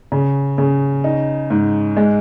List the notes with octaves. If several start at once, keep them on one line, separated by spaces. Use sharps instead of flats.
C#3
C#3
D#4
G#2
G#3